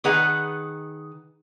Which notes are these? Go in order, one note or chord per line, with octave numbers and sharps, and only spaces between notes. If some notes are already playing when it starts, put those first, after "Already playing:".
D#3 G#4 B4 F#5 A#5